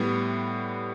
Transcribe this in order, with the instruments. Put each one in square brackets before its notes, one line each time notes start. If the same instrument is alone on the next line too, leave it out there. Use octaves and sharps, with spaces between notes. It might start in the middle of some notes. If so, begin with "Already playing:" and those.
Already playing: [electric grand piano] A2 G3 B3